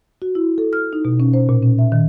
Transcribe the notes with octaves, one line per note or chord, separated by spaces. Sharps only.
F#4
E4
A4
F6
D#4
B2
C#4
C5
A#2
C#4
E5
D#3